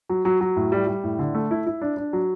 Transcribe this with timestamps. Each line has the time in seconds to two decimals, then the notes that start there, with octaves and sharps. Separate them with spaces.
0.09 F#3
0.25 F#3
0.41 F#3
0.56 A2
0.72 G3
0.87 G3
1.04 A2
1.19 D3
1.34 A3
1.51 E4
1.66 E4
1.82 D4
1.97 D4
2.13 F#3